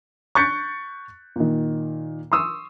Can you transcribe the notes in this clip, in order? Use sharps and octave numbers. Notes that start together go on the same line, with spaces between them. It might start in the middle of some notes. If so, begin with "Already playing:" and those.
C#6 F#6 G6 A6 B6 C#7
A#2 D#3
C6 C#6 D#6 E6